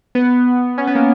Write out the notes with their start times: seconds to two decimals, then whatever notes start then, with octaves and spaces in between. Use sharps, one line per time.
0.15 B3
0.78 C#4
0.87 B3
0.95 A#3